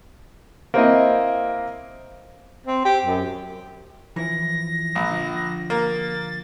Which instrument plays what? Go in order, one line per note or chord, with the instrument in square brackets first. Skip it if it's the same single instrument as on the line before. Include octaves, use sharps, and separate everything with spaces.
[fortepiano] A#3 C4 E4 D#5
[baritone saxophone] C4
G4
F#2
[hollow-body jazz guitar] E3 F3 E4 [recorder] A#6
[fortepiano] A#1 [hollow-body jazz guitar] G#2
[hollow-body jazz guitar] D3 F3
[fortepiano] A#3 [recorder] A6